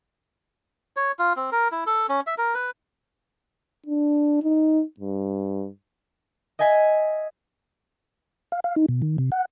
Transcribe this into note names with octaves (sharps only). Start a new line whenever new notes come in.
C#5
F4
C4
A#4
E4
A4
C#4
E5
A#4
B4
D4
D#4
G2
D#5 E5 G#5 G#6 B6
F5
F5
D#4
B2
D#3
C3
F#5